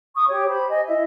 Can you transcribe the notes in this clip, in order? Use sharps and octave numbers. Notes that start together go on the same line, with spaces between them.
C#6 D#6
G4 C#5
G4 C5 B5
D#5 G#5
E4 D#5 E5